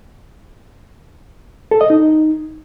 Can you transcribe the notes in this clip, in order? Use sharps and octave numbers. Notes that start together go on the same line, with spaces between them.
A4
D#5
D#4